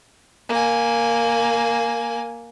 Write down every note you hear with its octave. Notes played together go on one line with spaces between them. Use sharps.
A#3 G#5